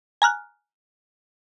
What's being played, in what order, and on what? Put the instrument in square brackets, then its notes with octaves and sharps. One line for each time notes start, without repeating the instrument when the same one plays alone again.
[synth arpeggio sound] G#5 A#5 F6 F#6